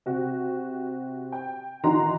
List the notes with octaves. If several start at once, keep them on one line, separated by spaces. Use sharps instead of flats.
C3 F#4
G5
D#3 E3 D#4 F#4 A#5 C6